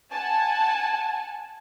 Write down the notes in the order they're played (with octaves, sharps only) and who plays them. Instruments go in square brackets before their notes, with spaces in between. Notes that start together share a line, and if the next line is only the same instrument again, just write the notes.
[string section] F#5 G#5 A5